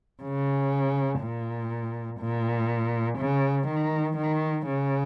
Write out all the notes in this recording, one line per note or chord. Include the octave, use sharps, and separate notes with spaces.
C#3
A#2
A#2
C#3
D#3
D#3
C#3